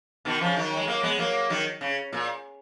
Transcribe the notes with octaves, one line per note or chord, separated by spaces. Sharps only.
B2 D#3
C#3 F3
D#3 F#3
G#3
F#3 A#3
G#3 B3
F#3 A#3
D#3 F#3
C#3
A#2